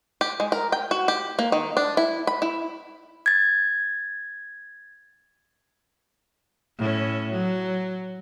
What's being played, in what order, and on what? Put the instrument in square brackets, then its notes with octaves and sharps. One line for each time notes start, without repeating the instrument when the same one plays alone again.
[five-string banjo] G4
G#3
A#4
G5
F#4
G4
A#3
D#3
D4
E4
B5
E4
[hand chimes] G#6 A6
[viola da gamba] A2 C#4
F#3